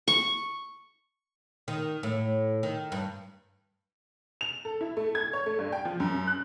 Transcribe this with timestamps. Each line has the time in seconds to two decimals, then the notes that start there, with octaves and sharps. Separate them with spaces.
0.08 C#6
1.68 D#3
2.03 A2
2.63 D#3
2.92 G2
4.41 F7
4.65 A4
4.81 E4
4.97 A3
5.15 G#6
5.33 C#5
5.46 A3
5.59 G2
5.72 G5
5.85 F3
6.00 F#2
6.27 F#6